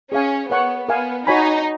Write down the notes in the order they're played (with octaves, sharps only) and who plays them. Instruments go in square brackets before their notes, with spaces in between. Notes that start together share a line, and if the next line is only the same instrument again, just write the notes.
[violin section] C#4 [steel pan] G#4 C#5 F5 G#5
[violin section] B3 [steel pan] A#4 C#5 F#5 C#6
[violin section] B3 [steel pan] A#4 F5 G#5
[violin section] D#4 [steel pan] F#4 C#5 G#5 B5